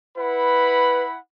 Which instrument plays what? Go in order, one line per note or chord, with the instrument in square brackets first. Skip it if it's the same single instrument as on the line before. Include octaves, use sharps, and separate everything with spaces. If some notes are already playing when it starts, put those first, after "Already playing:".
[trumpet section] E4 F#5 B5 [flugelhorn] B4